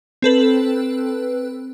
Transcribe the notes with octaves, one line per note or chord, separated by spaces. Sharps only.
C4 A4 B4